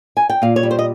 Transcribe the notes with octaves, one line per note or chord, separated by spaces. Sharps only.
G#5
G5
A#2 F5
C#5
G3
C5
D#5